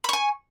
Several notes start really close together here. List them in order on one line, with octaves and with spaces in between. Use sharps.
B5 C#6 G#5